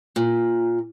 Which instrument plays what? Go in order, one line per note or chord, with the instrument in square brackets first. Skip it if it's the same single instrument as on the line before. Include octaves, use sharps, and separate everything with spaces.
[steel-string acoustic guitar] A#2